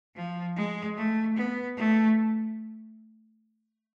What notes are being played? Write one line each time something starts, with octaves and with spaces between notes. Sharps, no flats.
F3
G#3
A3
B3
A3